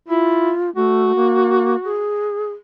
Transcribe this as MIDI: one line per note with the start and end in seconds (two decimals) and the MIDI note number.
0.08 0.50 64
0.08 0.70 65
0.76 1.15 57
0.76 2.11 66
1.15 1.76 58
1.84 2.50 68